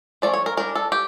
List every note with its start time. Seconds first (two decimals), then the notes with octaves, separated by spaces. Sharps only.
0.22 F3 A3 C#4 D5
0.34 C#5
0.46 A#4
0.57 G3 D4 A#4
0.75 A4
0.92 G4